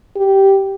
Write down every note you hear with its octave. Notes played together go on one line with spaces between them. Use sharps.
G4